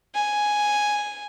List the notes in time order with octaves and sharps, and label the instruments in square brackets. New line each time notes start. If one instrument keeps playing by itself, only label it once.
[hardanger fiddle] G#5